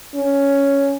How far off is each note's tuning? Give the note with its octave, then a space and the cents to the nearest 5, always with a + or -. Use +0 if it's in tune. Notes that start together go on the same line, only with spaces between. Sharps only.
C#4 +5